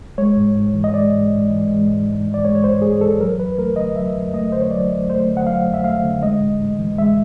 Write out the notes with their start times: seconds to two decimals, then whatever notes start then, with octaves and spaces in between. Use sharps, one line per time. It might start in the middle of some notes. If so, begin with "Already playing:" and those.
0.18 G#3 C#5
0.37 G#2
0.56 G#2
0.74 E3
0.84 D#5
0.94 G#3 D5
1.12 G#2
1.31 G#2
1.50 E3
1.69 G#3
1.88 G#2
2.06 G#2
2.25 E3
2.34 D5
2.45 G#3 C#5
2.55 C#5
2.63 G#2 C5
2.82 G#2 G#4
3.01 E3 A4
3.20 F#3 A#4
3.39 F2 B4
3.58 A3 A#4
3.76 D3 D#5
3.95 F#3 E5
4.15 F2
4.34 A3 D#5
4.52 D3 C5
4.61 C#5
4.71 F#3 D5
4.90 F2
5.09 A3 C5
5.28 D3
5.37 F#5
5.47 F#3 F5
5.66 F2
5.74 E5
5.84 A3 F5
6.04 D3
6.22 G#3 D#5
6.41 A2
6.61 A2
6.79 E3
6.98 G#3 E5